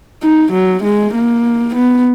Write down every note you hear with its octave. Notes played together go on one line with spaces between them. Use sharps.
D#4
F#3
G#3
A#3
B3